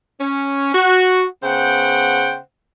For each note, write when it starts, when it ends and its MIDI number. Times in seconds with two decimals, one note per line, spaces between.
0.21 0.71 61
0.74 1.26 66
1.43 2.38 49
1.43 2.38 59
1.43 2.38 72
1.43 2.38 78
1.43 2.38 79